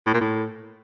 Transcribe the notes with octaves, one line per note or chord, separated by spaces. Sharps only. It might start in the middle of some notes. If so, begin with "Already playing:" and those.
A2
A#2
A2